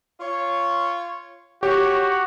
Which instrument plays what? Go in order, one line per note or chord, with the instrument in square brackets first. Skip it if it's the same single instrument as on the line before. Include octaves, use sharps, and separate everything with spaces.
[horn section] F4 C#5
[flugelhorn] F#4 [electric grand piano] G4 [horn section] C#5